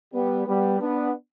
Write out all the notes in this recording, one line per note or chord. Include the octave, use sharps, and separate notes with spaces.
G3 B3
G3 B3
B3 D4